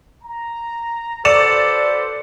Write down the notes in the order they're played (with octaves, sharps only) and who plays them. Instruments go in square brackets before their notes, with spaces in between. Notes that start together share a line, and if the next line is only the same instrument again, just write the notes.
[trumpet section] A#5
[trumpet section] F#4 B4 C5 [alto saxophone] A4 [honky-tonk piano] D5 E7 [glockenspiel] C#7